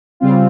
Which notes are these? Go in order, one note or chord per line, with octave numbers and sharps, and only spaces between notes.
C#3 G3 C4 F4